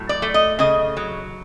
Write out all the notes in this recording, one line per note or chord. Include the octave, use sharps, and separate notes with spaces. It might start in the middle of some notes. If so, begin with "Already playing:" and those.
Already playing: A2 F#3
D5
A3
D#5
C#3 D#5
F#3